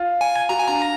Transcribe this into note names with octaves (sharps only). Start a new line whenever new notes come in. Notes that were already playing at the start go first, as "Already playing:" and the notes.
Already playing: F4
G#5
F#4 A#5
G#5
D4 A#5